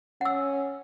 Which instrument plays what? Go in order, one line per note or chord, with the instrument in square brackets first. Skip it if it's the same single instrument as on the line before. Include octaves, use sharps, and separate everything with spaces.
[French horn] C#4 [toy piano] F#5 E6